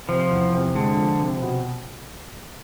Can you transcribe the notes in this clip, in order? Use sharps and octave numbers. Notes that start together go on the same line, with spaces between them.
C3 F3
E2
C3
D3 G#3
F3
C3
B2